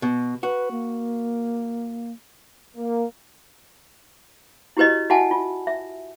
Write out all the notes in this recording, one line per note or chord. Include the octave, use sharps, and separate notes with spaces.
B2
F#4 B4
A#3
A#3
E4 F#4 G4 B4 C#5 D#5
F#4 E5 F#5 G#5 A5
F4
E5